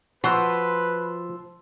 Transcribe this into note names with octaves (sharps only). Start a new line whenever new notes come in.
F3 F#4 B4 C6 E6